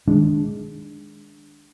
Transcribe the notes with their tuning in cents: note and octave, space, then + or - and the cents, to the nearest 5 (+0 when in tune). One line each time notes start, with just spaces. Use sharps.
D#3 +5 G#3 +0 D4 -5